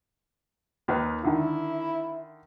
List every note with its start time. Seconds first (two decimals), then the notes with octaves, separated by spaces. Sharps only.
0.88 D#2 D#3 B4
1.25 D3 D#3 E4